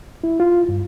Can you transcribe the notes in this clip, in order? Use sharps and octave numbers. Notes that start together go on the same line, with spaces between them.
E4
F4
G2